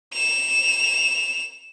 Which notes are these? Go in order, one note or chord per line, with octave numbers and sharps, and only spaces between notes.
E7 F7